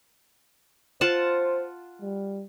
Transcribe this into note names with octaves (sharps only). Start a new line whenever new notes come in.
F4 C5 F#5 A5
G3